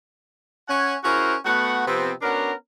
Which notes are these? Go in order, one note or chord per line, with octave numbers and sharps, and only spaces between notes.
C#4 F#5 G#5
C#4 E4 F#4 G#4 A#4 C5
A3 B3 F#4 F#5
C3 F3 B3 C4
B3 C#4 D4 F#4 A#4